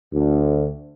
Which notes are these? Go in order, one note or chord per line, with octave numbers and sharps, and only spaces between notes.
D2